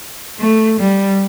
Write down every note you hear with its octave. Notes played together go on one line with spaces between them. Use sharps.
A3
G3